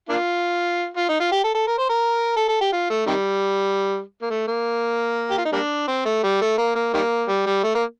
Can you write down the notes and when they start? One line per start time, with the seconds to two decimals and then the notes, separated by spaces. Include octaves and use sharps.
0.09 A#3 D4 F4
0.96 F4
1.09 D#4
1.20 F4
1.32 G4
1.44 A4
1.55 A4
1.67 A#4
1.78 C5
1.90 A#4
2.36 A4
2.48 A4
2.61 G4
2.72 F4
2.90 A3
3.06 C3 D#3 G3
4.22 A#3
4.30 A3
4.48 A#3
5.31 G4
5.38 F4
5.45 D#4
5.52 G3 A#3 D4
5.87 C4
6.05 A3
6.23 G3
6.41 A3
6.58 A#3
6.75 A#3
6.94 D#3 G3 A#3
7.28 G3
7.46 G3
7.63 A3
7.75 A#3